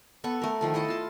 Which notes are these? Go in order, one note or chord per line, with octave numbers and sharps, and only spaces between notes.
B3 A4 C#6
A3 A#4
D#3 F3 A4
E4 A4 D#5
F4 A5